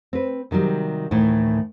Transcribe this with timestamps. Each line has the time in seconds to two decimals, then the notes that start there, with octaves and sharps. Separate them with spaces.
0.13 C4 B4
0.51 C3 D#3 F#3 G3
1.11 D2 A2 D#3 E3